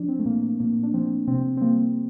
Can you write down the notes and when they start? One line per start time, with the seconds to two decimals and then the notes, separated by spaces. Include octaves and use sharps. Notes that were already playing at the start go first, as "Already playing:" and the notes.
Already playing: F3 D4
0.08 C4
0.19 A3
0.25 A#2 A#3
0.43 A#3
0.60 A#2 A#3
0.83 D4
0.94 F3 C4
1.27 C3 C4
1.57 C4
1.62 G3 A#3